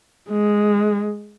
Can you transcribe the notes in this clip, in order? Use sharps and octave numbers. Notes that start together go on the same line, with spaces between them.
G#3